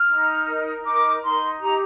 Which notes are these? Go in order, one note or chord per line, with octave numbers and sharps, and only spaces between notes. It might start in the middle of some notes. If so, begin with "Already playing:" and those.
Already playing: F6
D#4
A#4
D#4 D6
D#4 C6
G4 A#5